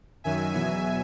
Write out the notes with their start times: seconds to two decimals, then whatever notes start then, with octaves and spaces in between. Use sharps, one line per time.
0.24 F#2 D#3 F#3 E5 G#5
0.53 E2 B2 F#3 E5 G#5